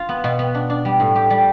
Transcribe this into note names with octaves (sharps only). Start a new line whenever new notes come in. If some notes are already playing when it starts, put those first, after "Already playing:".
Already playing: F4
B3
B2
B3
D4
D4
G3
A2
G4
G3